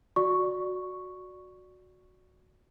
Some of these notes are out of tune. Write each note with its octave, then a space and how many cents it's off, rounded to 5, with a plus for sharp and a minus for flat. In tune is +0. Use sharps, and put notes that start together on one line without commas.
F#4 -10 D5 +0 C#6 +0